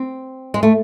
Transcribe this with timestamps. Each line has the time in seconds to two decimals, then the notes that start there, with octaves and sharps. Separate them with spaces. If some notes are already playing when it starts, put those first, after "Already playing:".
Already playing: C4
0.54 G#3
0.63 A3